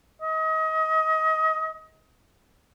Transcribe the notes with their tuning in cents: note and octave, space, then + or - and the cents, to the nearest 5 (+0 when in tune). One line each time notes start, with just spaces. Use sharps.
D#5 +30